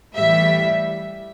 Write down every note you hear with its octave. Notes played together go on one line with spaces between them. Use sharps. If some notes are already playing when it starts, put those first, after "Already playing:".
A2 E3 G3 E5